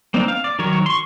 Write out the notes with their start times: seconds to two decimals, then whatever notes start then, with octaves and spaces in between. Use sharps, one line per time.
0.14 A#3 C4 D4 D#4
0.28 F5
0.44 D5
0.59 D#3 F#3 A#4 C#5
0.86 C6 C#6